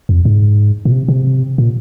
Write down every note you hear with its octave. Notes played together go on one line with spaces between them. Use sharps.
F2
G#2
A#2
C3
C3
A#2